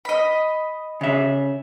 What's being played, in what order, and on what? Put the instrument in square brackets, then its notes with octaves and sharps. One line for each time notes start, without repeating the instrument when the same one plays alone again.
[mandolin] D#5 B5
[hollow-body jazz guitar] C#3 E5